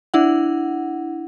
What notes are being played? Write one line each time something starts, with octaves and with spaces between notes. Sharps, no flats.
D4 E4 F#5